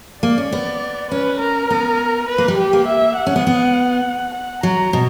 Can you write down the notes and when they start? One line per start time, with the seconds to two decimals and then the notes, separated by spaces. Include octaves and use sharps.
0.23 A#3 D5
0.38 C#4
0.52 B3
1.11 C#4 B4
1.40 A#4
1.70 B3
2.29 B4
2.38 A#3
2.48 G3
2.58 G4
2.73 A#3
2.87 E5
3.17 F#5
3.26 C#4
3.36 B3
3.47 B3
4.34 F#5
4.63 F#3 A#5
4.93 B2